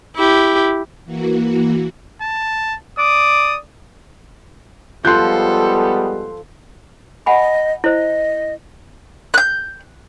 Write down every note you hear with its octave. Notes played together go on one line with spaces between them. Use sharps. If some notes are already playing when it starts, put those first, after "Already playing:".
E4 G4
E3 A#3 F#4
A5
D5 D#6
F3 G3 G#3 B3 A4 C6 F#6 G6
D#5 F#5 G#5 B5
E4 C5 D#5
F#6 G6